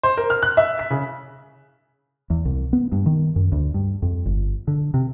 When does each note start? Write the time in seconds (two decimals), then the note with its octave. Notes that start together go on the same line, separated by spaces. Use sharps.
0.03 C5
0.17 A#4
0.30 F6
0.43 F#6
0.57 E5
0.79 B6
0.90 C#3
2.30 E2
2.45 C2
2.73 B3
2.92 G2
3.06 D#3
3.36 F#2
3.52 D2
3.74 G2
4.02 F2
4.26 G1
4.68 D3
4.94 C3